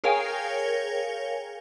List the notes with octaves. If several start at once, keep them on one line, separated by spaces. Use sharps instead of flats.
G#4 A#4 C#5 F5 G5 G#5